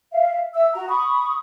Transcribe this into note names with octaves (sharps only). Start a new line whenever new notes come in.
E5 F5
E5 E6
F#4 A#5
B5 C#6 D#6